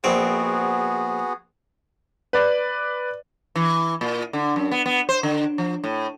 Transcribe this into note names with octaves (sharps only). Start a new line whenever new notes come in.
A#1 B3 C4 F#4 G#4
B4 D5
E3
A#2
D3
F#2
B3
B3
C5
D3
F3
A2